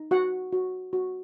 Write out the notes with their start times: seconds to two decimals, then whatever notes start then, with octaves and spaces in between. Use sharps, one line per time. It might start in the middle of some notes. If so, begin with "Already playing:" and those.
Already playing: D#4
0.11 F#4 F#5
0.52 F#4
0.93 F#4